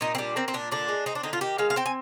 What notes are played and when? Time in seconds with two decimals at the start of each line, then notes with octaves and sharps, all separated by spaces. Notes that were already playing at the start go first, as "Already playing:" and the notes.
0.01 A#2 D#4
0.15 C4
0.18 G3 D4
0.36 A#3 C4
0.48 C4
0.54 A#2 D4
0.71 D3 D4
0.89 G#3
1.06 C4 D#4
1.15 D4
1.23 D3 D#4
1.33 F4
1.41 D#3 G4
1.58 G#3 F5
1.70 F5
1.76 C4 G5
1.86 G#5